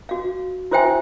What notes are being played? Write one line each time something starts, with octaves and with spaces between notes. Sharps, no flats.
F#4 F5
E4 F#4 C5 E5 G5 G#5